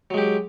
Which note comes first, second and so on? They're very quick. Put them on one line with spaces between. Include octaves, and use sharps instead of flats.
F#3 G#3 G4